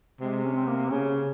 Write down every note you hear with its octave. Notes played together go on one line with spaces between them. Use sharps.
C3 G#3
C#4
C4
A#3
C#3 C#4